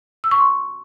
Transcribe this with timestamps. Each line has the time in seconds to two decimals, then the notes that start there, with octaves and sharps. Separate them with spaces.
0.24 E6
0.31 C#6
0.39 C6